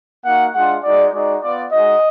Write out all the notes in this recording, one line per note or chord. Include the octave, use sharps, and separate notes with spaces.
A#3 D#4 F#4 F#5
G#3 D4 F4 F#5
G#3 D#4 F#4 D5
G#3 D#4 F#4 D5
B3 F4 D5
G#3 D#4 F#4 D#5